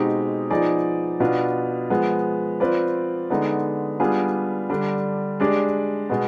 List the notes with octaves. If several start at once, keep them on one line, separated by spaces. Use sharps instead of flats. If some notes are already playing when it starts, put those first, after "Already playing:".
Already playing: B2 G#3 C4 D#4 G4
F3 B3 D#4 G#4 D5
B2 B3 D4 F4
F3 G#3 B3
F3 C4 F4 B4 D5
D3 G#3 B3 D#4
G3 B3 D4 F4 G#4
D3 G3 D4
G#3 D4 G4 D5
B2 G#3 B3